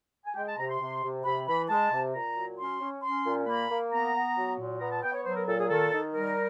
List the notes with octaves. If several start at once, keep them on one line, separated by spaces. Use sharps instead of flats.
G#5
G#3 G5
A5
C3 A#5
C6
C3
C3
C3 B5
E3 B5
G#3 A5
C3
A#2 A#5
F#3
C#4 C6
C#4
C#4 C6
A#2
A#3 B5
A#3
B3 A#5
B3
F#3
A#2
B3 A#5
A5
B3 G5
C#5
F#3 C5
A#4
A#2 A4
G#4
D#3 A4
D#3
G3 A#4